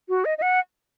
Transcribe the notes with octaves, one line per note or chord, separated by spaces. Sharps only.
F#4
D#5
D#5
F#5